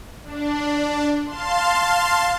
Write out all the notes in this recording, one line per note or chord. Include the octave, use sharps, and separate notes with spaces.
D4
F5 A5 C6